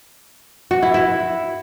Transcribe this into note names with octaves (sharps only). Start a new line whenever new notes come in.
F#4
E4
E4